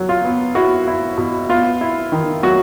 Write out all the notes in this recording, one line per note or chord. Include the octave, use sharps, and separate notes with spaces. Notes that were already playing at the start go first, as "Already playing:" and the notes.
Already playing: F#3
F4
B3
E4 F#4
E4
B2
B3 F4
E4
D#3
F#3 F#4